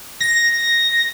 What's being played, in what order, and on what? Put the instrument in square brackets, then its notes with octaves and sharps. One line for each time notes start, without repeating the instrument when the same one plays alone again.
[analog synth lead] A#6